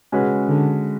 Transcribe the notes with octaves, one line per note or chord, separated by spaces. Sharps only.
C#3 G#3 C#4 F#4 B4
D3